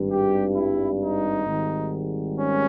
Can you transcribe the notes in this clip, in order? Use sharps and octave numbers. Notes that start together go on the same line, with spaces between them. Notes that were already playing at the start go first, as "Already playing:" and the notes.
Already playing: G#1 G2 G3
G4
E4
D#4
G#1 G#2 D#3 G3
C#4